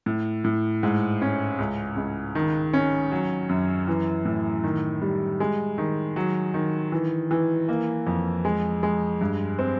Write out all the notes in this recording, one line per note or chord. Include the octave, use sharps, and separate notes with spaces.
A2
A2
G#2
C#4
C#2
C#2
D#3
C#4
F#3
F#2
E3
A2
D#3
G3
G#3
D#3
F#3
D#3
E3
E3
A#3
F2
G#3
G#3
G2
C4